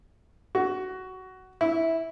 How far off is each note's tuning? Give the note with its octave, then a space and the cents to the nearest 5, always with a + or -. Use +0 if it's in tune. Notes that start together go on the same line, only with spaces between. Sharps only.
F#4 +15
E4 -10